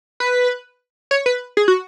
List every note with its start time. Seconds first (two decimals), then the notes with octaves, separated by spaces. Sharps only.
0.20 B4
1.11 C#5
1.26 B4
1.57 G#4
1.68 F#4